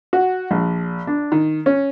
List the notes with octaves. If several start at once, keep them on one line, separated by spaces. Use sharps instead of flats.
F#4
A#1
D4
D#3
C#4